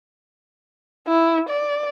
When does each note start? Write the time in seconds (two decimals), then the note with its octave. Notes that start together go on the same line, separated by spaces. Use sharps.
1.08 E4
1.49 D5